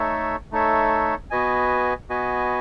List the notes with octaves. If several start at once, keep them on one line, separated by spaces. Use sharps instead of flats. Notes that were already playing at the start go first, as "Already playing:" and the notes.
Already playing: A3 D#4 A4 C#5 E5
A3 D#4 A4 C#5 E5
B3 F#4 B4 D#5 G#5
B3 F#4 B4 D#5 G#5